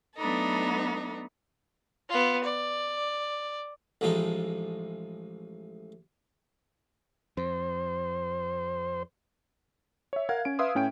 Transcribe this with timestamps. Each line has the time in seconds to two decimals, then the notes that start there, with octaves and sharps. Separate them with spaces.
0.16 F#3 A3 B3 D4 D#4 A4
2.09 B3 F4
2.44 D5
4.01 A1 A2 F3 G#3 D#4 A4
7.37 F2 C5
10.13 C#5 E5
10.29 A#4 F5 F#5 G#6
10.45 C#4 D7
10.59 B4 E5 F5 C6 D#6 E6
10.75 A2 C#4 G5 D7